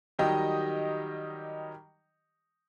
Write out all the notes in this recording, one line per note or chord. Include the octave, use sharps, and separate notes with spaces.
D#3 F#3 G3 G4 D#5